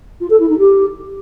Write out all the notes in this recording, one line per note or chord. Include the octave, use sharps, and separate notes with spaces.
F4
A4
E4
D#4
G4